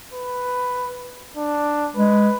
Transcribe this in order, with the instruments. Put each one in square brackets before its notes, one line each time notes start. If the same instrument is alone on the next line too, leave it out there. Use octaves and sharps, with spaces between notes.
[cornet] B4
D4
[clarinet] G#3 [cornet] B4